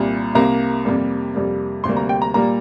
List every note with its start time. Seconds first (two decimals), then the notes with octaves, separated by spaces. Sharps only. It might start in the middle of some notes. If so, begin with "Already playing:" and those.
Already playing: C2 A#2 G3
0.35 C2 C3 A#3 A#5
0.85 F2 C3 G3 A#3
1.34 F2 C3 G3 A#3
1.84 D2 C3 G3 A#3 C6
1.97 A#5
2.09 G5
2.22 A#5
2.34 A#2 G3 A#3 A#5